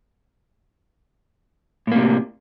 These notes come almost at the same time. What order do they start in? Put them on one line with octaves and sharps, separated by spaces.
A2 A#3 C3